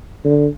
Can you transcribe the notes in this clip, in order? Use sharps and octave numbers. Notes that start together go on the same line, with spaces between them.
D3